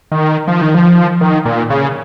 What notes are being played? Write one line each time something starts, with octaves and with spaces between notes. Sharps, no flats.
D#3
F3
D#3
F3
D#3
A#2
C#3